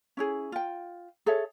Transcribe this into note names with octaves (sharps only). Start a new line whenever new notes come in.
C#4 E4 G#4
F4 G5
G#4 A4 C#5 E5